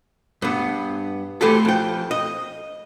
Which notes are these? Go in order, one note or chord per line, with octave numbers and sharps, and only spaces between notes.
G2 B3
E3 A3 C4 G4 A4
F2 G5
D#5